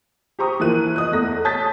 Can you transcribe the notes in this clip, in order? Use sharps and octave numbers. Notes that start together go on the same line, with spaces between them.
G4 C5 A#5 C#6 D#6
E3 F3 A#3 F#6 D#7
D#5 D#6 F#6
E2 A3 A#6
C#5 A5 D#6 G6 A6 B6